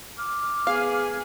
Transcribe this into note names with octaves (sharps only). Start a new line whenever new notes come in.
D6 F6
B3 G#4 F5